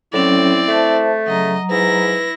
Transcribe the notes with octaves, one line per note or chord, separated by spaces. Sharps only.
A2 F#3 C4 C#4 E4 D5
A3 C5 E5 A5
C#3 F#3 D#5 A#5
G#2 E4 B4 A#6